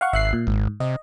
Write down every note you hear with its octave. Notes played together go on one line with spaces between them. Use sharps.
F5 F#5 C#6
G#1 E5 F#6 C7
A#2
G#1 G#2
C3 D#5